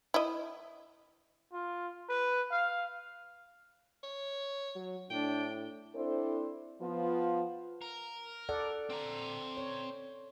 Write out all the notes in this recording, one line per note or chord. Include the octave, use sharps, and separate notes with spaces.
E4 D#5
F4
B4
F5
C#5
F#3
A2 D4 G5
C4 D4 E4 A4 C5 D5
F3 B3 F4
A#4
A4 D5 F#5
C4 A#5
C#5